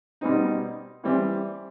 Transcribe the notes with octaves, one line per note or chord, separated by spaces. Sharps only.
B2 G3 C4 D#4
E3 G3 C4